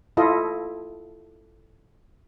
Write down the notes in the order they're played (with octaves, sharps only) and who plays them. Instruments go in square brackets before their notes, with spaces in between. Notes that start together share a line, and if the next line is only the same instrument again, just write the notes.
[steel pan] E4 F4 A4 D#5